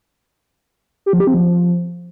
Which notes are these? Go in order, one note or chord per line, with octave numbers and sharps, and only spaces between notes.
G4
F3
G4
C4
F3